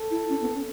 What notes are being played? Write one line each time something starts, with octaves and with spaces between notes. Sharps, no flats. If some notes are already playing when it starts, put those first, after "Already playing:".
Already playing: A4
E4
C#4
B3
C#4